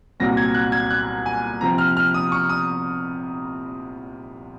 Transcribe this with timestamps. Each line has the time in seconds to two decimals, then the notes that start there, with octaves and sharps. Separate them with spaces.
0.20 C2 A#2 F#3 C4 A#6
0.37 G#6
0.54 F#6
0.72 G#6
0.90 F#6
1.26 G#5
1.61 C3 F3 C4 A#5
1.78 F6
1.97 F6
2.14 D#6
2.32 C#6
2.49 D#6